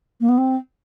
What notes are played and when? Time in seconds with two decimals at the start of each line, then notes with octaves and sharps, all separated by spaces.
0.20 A#3
0.28 B3
0.37 C4